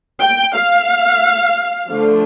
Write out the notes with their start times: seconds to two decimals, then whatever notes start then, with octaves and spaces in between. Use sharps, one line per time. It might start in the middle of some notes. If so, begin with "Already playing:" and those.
0.21 G5
0.55 F5
1.88 D3 F3 A3 D4